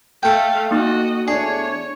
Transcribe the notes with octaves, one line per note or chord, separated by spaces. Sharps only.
A3 A4 F5 G5
A#3 D#4 F#4 D#5 D6
E2 A3 D4 G#4 C#5 C7